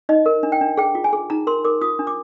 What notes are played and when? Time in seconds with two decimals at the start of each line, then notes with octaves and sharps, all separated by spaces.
0.09 D#4 D#5
0.26 A#4
0.43 D4
0.52 G5
0.61 D4
0.77 G#4 G5
0.95 F4
1.04 G#5
1.13 G#4
1.30 D#4 A#5
1.47 A#4 C6
1.65 A#4 D6
1.81 F4 D#6
1.99 D4
2.07 D6